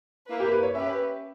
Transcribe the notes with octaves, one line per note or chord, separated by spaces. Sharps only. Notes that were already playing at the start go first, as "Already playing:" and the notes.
A#3 E4 B4
G4
B4
C#5
C#4 G4 B4 E5